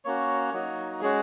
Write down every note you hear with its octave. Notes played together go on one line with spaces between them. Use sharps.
A#3 C#4 F#4 C#5
F#3 A#3 D#4 F#4
G#3 C#4 F#4 G#4